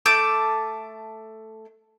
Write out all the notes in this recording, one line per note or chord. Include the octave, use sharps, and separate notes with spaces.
A3 A5 D6 G6